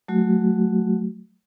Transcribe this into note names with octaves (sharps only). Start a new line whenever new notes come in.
F#3 A3 F#4